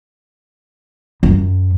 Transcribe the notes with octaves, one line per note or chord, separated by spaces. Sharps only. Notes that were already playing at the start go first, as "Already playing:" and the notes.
F#2